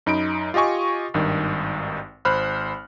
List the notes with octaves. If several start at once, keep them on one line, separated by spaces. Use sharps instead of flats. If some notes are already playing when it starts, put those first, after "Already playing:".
F#2 D#4 B5 D7
F4 G4 D#5 G#5 C#6
G#1 G2 D#3
G#1 C5 B5 F6 F#6